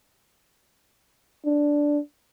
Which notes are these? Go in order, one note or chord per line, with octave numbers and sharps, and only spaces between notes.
D4